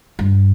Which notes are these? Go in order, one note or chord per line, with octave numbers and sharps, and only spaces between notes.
G2